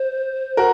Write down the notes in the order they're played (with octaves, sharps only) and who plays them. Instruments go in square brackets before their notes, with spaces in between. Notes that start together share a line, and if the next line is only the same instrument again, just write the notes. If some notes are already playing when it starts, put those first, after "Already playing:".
Already playing: [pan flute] C5
[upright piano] F#4 A#4